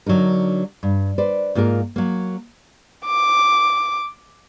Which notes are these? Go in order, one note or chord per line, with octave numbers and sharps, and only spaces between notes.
D3 F#3 D4 D#4 A#4
G2
B4 C5 D5
G#2 A#3 F4 A4 A#4
F#3 A#3
D6